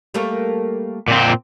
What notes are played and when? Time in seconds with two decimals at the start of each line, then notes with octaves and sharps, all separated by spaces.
0.14 G3 A3 A#3
1.08 A#2 C4